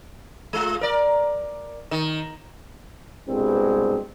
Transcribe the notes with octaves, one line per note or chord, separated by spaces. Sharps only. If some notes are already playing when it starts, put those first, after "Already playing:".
G#3 F4
A#4 D5
D#3
C2 G2 B2 G#3 C4